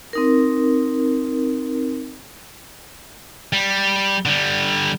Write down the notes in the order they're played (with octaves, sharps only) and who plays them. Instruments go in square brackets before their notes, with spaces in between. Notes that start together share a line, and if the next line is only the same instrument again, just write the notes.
[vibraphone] C4 D#4 A#4
[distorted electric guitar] G3
D3 G3